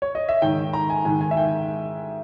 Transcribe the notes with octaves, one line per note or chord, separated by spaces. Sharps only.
C#5
D#5
E5
G#2 D#3 G5
A#5
G#5
G#2 D#3 G#5
G#5
E5
G5